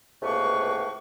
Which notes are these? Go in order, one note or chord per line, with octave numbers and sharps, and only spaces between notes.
C#2 A2 C3 A#3 B4 C#6